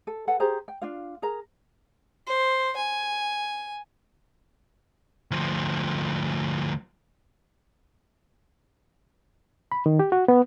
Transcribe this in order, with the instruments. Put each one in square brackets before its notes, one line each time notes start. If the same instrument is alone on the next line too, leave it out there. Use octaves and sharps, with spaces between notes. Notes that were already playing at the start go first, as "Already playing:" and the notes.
[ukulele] A4
A4 B4 F#5
G4 G#4 C5 A#5
G5
D4 F4 F5
G#4 A#4 A#5
[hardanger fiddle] C5
G#5
[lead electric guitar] D2 F3
[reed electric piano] B5
D#3
G4
F#4
B3